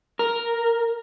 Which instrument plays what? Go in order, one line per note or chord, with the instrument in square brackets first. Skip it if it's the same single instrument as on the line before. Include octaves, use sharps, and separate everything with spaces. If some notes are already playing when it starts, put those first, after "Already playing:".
[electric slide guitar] A#4